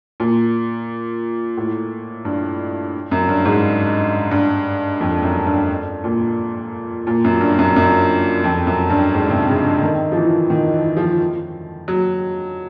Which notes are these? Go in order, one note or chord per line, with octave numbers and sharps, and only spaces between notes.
A#2
A2
G2
F#2
G2
G#2
G2
F2
F#2
G2
A#2
A#2
F#2
G2
F#2
F#2
F2
F#2
G2
G#2
C3
C#3
D3
D#3
F3
E3
D#3
E3
F3
F#3